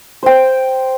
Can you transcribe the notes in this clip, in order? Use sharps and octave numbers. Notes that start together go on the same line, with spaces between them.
C5 G5